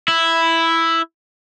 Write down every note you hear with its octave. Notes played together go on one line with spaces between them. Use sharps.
E4